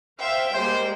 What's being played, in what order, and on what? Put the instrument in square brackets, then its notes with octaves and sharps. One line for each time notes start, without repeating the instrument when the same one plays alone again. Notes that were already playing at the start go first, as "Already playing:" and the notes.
[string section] C5 E5 F5 [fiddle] G5
[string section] G3 G#3 A#3 [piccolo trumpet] C5